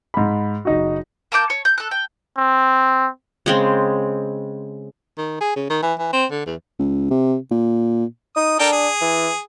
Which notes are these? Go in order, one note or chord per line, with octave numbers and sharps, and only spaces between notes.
G#2 B5
F#1 D#4 F#4
A#3 A5 D6 G6
C#5
G6
A4 F#6
G5
C4
C#3 G#3 C4
D#3
G#4
C#3
D#3
E3
E3
C4
D3
E2
C#2
C3
A#2
D#4 D#6
D4 A4 A#4 G5
G#4
E3